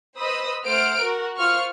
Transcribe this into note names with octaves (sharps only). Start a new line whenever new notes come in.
B4 C5 D#5 B5 D#6 E6
A3 C5 F#5 F6 D7
F#4 A#4
F4 C5 C#6 F6